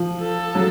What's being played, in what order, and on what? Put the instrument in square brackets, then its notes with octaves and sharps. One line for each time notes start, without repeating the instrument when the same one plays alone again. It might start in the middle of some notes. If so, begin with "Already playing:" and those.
Already playing: [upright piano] F3
[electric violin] A4
[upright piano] F#3